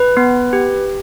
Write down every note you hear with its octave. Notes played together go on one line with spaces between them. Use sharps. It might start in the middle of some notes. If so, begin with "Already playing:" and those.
Already playing: B4
B3
G4